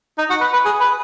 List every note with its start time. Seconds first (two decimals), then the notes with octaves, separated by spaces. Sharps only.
0.18 D#4
0.30 F#4
0.41 B4
0.53 B4
0.65 G#4
0.81 B4